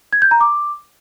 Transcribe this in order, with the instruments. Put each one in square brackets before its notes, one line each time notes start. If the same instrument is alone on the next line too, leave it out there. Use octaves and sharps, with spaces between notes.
[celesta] G#6
G6
A#5
D6